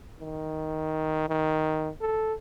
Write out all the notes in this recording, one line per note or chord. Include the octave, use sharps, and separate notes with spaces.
D#3
D#3
A4